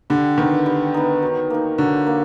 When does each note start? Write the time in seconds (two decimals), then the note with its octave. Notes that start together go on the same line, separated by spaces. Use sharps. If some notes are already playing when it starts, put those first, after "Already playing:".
0.10 D3 G3
0.38 D#3 B3 D#4
0.66 G3
0.94 B3 D#4
1.22 F#3
1.50 A#3 D#4
1.78 D3 F#3
2.07 A#3